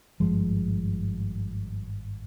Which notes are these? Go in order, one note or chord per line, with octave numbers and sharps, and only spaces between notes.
G#1 G2 F3 G#3